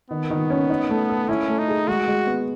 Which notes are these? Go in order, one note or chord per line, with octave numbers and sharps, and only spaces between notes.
D#3 B3
D#3
C#4
D#4
A3
A4
C#4 E4
A3
D#4
G#4
G#3 F#4
G#3
B3